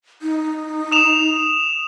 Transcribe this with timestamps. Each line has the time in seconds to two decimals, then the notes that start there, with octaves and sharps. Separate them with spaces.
0.22 D#4
0.92 D#6 E7 F7